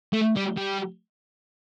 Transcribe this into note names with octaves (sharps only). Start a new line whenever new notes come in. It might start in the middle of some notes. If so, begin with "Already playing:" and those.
A3
G3
G3